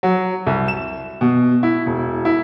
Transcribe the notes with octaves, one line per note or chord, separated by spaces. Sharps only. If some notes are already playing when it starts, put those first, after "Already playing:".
F#3
C2
E7
B2
E4
E1
E4